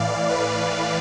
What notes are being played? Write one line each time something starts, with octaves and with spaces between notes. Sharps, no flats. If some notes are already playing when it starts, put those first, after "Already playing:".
Already playing: A2 E3 D5 F5
B4 D5